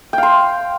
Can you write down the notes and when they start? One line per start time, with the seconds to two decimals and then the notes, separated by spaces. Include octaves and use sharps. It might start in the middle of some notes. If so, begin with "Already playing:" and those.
0.13 G5
0.18 F5
0.23 C6